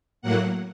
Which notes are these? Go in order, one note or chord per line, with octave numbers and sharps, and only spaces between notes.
A2 F#3 A#3 F#5